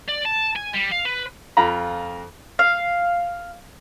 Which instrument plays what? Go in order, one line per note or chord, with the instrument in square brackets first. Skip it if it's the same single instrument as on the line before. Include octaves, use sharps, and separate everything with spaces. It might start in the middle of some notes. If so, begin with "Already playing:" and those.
[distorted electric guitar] D5
A5
G#5
G3
F5
B4
[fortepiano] F2 F4 A#5 B5
[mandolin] F5